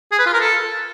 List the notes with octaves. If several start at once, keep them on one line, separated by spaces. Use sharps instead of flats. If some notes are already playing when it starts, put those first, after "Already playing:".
G#4
B4
F4
A#4
A4